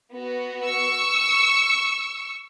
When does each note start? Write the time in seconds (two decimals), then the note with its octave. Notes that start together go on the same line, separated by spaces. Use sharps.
0.11 B3 F#4
0.67 C#6 E6